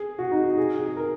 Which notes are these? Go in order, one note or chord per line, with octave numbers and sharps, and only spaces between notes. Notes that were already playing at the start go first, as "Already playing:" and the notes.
Already playing: G#4
F#4
D#4
G#4
G#4
A#4